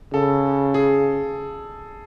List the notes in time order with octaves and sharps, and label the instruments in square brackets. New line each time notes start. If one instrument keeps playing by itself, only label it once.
[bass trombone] C#3 [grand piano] A4
[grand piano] G#4